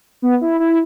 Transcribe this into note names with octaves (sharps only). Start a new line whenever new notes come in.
B3
E4
E4